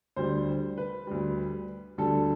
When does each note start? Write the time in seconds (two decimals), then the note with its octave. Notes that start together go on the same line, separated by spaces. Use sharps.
0.16 D2 D3 G3 C5
0.78 B4
1.07 D2 D3 G3
1.98 D2 D3 G3 A4